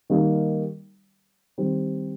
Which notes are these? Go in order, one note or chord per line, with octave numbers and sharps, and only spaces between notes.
D#3 G3 A#3 D#4 G4
D#3 G3 C4 G4